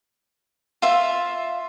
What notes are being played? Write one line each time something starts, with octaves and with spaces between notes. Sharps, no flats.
F4 E5